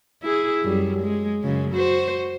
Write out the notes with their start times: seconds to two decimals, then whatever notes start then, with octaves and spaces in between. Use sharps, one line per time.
0.23 E4 G#4
0.63 F#2 G3
1.03 G#3
1.43 F#2 C#3 G#3
1.72 F#4 C5